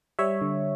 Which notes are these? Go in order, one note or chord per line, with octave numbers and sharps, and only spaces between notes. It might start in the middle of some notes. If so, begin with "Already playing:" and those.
G3 C#5 E5
D3